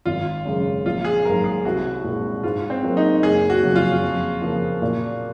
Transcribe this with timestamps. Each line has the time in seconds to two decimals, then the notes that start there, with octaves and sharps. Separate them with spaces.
0.06 G#1 F4
0.45 F#2 C#3 G#3
0.86 A#1 F4
1.05 G#4
1.24 G#2 F#3 A#3 A#4
1.44 G#4
1.65 C2 F#4
2.04 A#2 G#3
2.43 G#2 F4
2.70 C4
2.83 F#3 A#3 F4
2.97 D#4
3.23 F#1 G#4
3.50 F#4
3.63 F2 C#3 F#3
3.76 F4
4.02 F2
4.42 C#3 F3 A#3
4.82 A#2